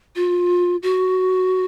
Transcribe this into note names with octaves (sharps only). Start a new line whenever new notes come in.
F4
F#4